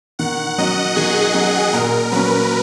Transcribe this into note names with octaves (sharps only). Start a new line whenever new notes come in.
D#3 F#5
F#3 C#4 D#5
D#3 G#4
F#3 C#4
A#2 A#4
F#3 A#3 C#4 B4